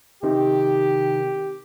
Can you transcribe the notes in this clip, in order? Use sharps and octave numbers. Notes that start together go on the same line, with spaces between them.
C3 D#3 G4